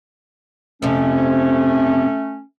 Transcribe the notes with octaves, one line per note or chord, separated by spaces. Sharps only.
F2 C3 A3 C#4